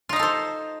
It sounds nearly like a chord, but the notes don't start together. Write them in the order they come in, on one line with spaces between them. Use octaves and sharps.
F4 D#4 F5 A4 C5